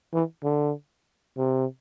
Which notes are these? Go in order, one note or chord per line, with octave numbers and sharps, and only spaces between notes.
E3
D3
C3